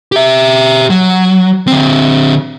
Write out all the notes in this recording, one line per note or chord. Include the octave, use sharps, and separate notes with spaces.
G4 E5
F#3
D3 C4